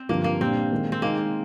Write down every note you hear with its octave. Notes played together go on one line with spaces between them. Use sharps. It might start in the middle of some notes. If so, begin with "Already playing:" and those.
Already playing: C4
G2 D3 F3 A#3
A#3
A#2 G3 C4 D4
D#3 G#3 D#4
C4
D#3 G#3 A#3 D#4